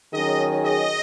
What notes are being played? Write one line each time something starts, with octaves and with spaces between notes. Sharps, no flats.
D#3 F#3 C#4 G#4 D#5
D#5